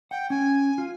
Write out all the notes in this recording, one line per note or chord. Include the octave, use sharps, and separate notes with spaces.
F#5 G5
C#4 G#5
F4